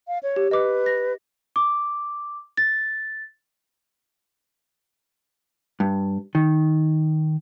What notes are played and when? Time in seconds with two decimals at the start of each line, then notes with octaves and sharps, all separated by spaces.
0.08 F5
0.23 C#5
0.36 G4
0.51 B4 D#5 D6
0.86 A#6
1.56 D6
2.57 A6
5.80 G2
6.35 D#3